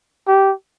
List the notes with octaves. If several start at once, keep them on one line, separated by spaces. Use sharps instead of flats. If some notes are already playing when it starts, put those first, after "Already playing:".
G4